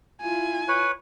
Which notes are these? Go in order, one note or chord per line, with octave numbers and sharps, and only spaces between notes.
E4 F4 G#5
B4 C#5